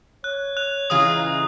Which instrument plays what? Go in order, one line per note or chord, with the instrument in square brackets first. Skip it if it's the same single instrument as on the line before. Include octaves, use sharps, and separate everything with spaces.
[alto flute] C#5 [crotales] F#6
[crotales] F#6 F7
[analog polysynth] C#3 E3 A#5 [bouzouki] G#3 F4 G#4 [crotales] D#6